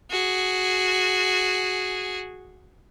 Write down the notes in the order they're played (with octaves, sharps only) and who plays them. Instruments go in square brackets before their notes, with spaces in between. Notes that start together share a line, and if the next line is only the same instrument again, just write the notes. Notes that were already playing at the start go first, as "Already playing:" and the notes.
[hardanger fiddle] F#4 G#4